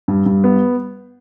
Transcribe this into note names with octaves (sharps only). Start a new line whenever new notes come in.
G2
G2
B3